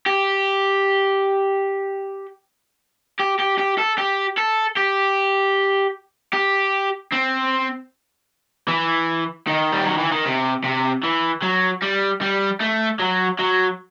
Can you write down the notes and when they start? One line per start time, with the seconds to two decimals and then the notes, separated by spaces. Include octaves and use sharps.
0.06 G4
3.20 G4
3.40 G4
3.59 G4
3.79 A4
3.98 G4
4.37 A4
4.77 G4
6.33 G4
7.12 C4
8.68 E3
9.47 D#3
9.72 G3
9.85 F#3
9.98 E3
10.12 D#3
10.25 C3
10.64 C3
11.04 E3
11.42 F#3
11.82 G3
12.21 G3
12.60 A3
12.99 F#3
13.39 F#3